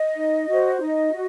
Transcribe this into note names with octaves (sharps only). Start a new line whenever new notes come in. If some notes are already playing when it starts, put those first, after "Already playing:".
Already playing: D#5
D#4
F#4 C5
D#4 D#5
F#4